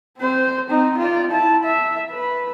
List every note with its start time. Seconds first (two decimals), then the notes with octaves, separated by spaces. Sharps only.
0.18 C4 C5
0.68 C4 D#4
0.98 F4 D5
1.31 E4 A5
1.64 E5
2.12 B4